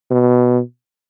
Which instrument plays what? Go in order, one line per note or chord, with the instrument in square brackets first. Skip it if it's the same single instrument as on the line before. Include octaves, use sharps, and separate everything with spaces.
[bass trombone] B2